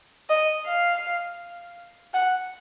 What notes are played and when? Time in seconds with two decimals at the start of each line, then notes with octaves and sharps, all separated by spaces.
0.29 D#5
0.66 F5
2.14 F#5